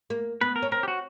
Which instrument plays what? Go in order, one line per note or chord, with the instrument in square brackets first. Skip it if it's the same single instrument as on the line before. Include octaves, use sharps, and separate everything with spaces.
[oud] A#3
[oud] B3 [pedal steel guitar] B4
[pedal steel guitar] A#4
[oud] C#4
[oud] C4 [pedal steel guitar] A#4
[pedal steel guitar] G4
F#4